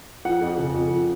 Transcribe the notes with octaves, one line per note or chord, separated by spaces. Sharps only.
F3 F#5
F2
C#3
F2
F3